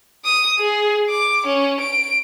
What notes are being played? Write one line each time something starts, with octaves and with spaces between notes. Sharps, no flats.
D#6
G#4
D6
C#4
D7